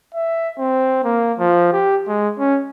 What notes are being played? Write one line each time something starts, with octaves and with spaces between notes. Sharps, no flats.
E5
C4
A#3
F3
G4
G#3
C#4